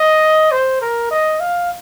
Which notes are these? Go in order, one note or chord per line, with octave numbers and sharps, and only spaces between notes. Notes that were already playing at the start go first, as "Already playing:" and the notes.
Already playing: D#5
C5
A#4
D#5
F5